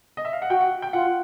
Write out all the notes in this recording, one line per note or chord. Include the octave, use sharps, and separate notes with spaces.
D#5
E5
F5
F#5
F#4 G5
F#5
G5
F4 F#5